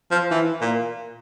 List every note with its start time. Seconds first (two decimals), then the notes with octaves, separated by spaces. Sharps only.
0.11 F3
0.31 E3
0.61 A#2